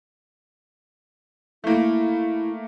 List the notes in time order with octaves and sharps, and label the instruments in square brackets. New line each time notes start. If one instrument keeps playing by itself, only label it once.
[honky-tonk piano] A3 A#3 [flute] E4